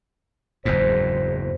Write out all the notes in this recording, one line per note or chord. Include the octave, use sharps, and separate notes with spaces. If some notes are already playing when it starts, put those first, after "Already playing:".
F#1 E2 G#2 C5